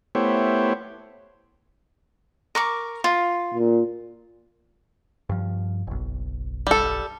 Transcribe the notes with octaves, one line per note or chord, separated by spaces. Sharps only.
A3 B3 E4 G4 C5 C#5
A#4 C#6 D6
F4
A#2
G2 F3
F#1 B1
G3 A4